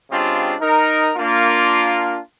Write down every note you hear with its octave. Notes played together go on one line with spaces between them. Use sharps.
C#3 G#3 C4 D4 F4 G4
D#4 A#4
A#3 D4 F4